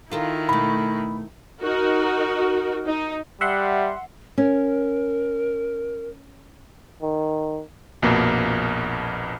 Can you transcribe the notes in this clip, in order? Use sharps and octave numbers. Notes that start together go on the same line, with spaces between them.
D#3 E4 F4 A4 A#4
B2 A3 B5
D#4 F#4 A#4
D#4
G3 E5 F#5 C6
C#4 A#4
D#3
A#1 F2 B2 A#3